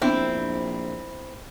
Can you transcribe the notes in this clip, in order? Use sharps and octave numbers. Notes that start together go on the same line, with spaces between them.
A#1 B3 C4 D4 E4